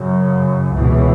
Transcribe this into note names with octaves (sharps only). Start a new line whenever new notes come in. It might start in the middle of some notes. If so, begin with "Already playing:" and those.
Already playing: F#2 C#3
C#2 B2 E3